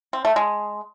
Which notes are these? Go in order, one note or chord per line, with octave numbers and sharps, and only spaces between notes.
C4
A3
G#3